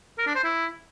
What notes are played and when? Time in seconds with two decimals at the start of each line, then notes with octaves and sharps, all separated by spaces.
0.18 A#4
0.27 D4
0.35 C5
0.44 E4